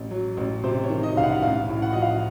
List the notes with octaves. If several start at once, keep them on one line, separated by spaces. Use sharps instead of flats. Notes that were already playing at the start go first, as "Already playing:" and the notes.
Already playing: A1
F#3
A1
C3 C5
C#5
D#3
D#5
C2 F5
F#5
A1 F5
A2
F#5
F3 D#5
F5